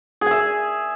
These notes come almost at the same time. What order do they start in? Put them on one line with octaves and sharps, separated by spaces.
G#4 G#5 E5